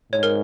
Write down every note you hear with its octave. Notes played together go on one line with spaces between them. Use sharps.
G#2 C#5
A#4